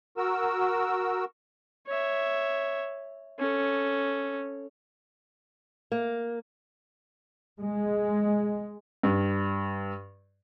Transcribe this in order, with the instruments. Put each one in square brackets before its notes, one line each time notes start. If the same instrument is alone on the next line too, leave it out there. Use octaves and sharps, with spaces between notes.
[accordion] F#4 A#4 E6
[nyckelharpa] C#5 E5
C#4 A4
[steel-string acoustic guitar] A#3
[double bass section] G#3
[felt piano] G2